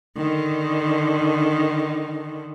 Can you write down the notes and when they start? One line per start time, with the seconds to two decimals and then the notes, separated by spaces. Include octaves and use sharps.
0.17 D3 D#3